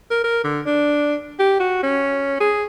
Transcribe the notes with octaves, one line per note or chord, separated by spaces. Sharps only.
A#4
A#4
D3
D4
G4
F#4
C#4
G#4